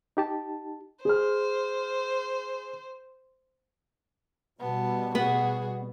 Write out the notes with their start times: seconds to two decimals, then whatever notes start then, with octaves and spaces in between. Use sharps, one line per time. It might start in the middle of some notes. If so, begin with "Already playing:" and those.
0.17 D#4 G4 A5
1.05 G#4 C5 F6
4.60 B2 G3 B3 A5
5.15 B3 F#4 G#4